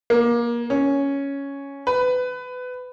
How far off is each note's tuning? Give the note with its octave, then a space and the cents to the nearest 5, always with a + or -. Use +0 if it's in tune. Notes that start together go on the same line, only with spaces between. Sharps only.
A#3 +25
C#4 +5
B4 +25